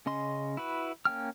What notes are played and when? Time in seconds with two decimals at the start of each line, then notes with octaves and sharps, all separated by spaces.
0.06 C#3 C#4 D#5 C6
0.57 E4 F#4 B4
1.05 A#3 C#4 G5 F6